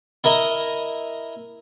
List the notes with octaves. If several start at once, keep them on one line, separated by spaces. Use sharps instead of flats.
E4 A#4 D#5